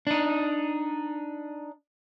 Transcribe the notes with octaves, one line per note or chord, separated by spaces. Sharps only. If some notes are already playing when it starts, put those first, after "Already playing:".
D4 D#4